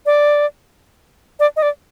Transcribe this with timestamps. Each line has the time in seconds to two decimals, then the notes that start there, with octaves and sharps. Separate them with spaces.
0.06 D5
1.40 D5
1.56 D#5
1.62 D5